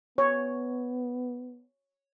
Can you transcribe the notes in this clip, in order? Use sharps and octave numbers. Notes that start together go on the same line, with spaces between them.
B3 C#5